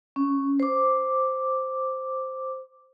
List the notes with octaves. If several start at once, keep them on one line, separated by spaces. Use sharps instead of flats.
C#4
C5 D6